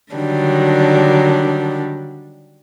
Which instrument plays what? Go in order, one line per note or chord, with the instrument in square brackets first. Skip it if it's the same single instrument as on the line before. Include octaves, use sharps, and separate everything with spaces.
[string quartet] D3 D#3 F#3 G3 D4